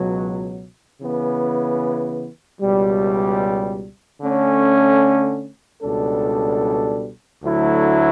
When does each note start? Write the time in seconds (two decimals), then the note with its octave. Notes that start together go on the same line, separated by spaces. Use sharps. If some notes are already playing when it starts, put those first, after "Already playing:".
Already playing: C#2 B2 F#3
1.00 C#3 E3 B3
2.61 C#2 B2 G3
4.21 D3 A3 C#4
5.82 C#2 B2 G3 D4 A4
7.43 D2 D3 F#3 A3 E4